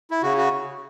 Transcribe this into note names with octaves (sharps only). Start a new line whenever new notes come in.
E4
C#3 F#4
F#4